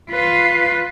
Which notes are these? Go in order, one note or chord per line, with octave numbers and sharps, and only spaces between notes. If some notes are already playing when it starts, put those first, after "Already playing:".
F4 B4